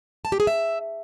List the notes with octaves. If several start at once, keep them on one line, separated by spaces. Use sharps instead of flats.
A5
G4
G#4
E5